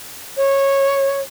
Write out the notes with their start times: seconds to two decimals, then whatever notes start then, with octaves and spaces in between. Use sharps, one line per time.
0.37 C#5